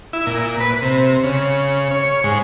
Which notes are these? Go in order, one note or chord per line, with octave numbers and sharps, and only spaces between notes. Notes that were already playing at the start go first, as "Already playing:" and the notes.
E4
A#2
B4
C3
C#3
C#5
G#2